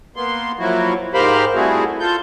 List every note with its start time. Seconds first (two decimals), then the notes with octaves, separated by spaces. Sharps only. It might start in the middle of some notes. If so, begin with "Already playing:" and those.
0.16 A#3 B3 C6
0.59 F3 F#3 A#3 E4 F#4
1.14 G#2 G4 A#4 C5 F5 B5
1.55 G3 A3 C4 E4 F#4 G#4
2.00 F4 A4 G6